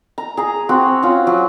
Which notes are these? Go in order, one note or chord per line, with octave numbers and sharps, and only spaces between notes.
A#5
G#4 A#5
C4 F#4
C#4 F4
F#3